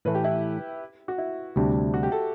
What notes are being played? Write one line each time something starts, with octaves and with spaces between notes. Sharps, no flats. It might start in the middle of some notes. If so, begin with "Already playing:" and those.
A2 E3 A3 B4
G4
E4
F#4
E4
D2 C3 G3 D4
F#4
G4
A4